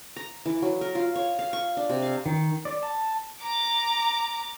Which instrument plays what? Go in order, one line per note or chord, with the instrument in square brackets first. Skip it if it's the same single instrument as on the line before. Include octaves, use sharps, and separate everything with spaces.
[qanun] A#5
E3
F#3
A#4
F4
C#5
F5
C#6
D4
C3
F5
[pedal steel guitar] D#3
D5
A5
[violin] A#5 D6